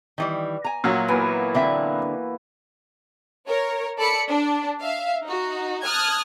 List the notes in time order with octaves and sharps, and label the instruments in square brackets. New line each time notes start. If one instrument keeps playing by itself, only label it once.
[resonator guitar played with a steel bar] D#3 E3 G3
G#5 A#5
[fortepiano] A#2 F#3 [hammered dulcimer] F#4 E5
[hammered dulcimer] E3 A#3 B3
[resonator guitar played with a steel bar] D3 C4 E5
[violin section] A#4 C#5
A4 D5 B5 C#7
D4
E5 F5
D#4 F#4
A5 D#6 F6 F#6 G#6